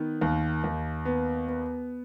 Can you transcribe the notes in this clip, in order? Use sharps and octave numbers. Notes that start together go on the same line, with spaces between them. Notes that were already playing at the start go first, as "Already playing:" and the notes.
Already playing: D#3 B3
D#2
D#2
B3
B3